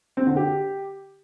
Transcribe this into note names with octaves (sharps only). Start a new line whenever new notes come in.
C4
D3
G4